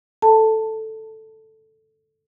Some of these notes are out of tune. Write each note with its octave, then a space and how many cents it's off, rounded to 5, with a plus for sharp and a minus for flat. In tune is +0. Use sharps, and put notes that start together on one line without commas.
A4 +0 A5 +10